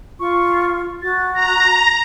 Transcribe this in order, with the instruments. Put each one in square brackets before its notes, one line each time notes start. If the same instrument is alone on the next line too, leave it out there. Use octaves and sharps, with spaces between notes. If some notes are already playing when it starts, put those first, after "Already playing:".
[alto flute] F4 [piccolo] C#6
[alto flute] F#4 [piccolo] A6
[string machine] A#5 [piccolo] A#6